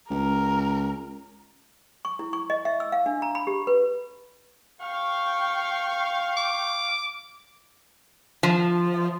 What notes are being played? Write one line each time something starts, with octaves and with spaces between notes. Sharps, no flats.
C#2 A#4
C#6
E4
C#6
D#5
E5
E6
F5
D4
A#5
B5
G4
B4
F5 G5 C#6
D6
F3